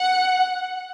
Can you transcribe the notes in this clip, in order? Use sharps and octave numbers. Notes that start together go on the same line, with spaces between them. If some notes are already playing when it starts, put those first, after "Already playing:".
Already playing: F#5